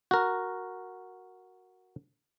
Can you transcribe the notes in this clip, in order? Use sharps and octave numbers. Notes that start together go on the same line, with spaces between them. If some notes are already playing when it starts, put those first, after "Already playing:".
F#4 A#4